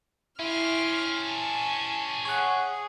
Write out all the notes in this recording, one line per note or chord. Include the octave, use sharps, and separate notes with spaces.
C#4 E4 G4 C6 F6
G#5 A5
G#4 C#5 F#5